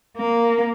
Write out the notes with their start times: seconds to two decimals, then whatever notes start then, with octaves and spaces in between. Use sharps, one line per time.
0.18 A#3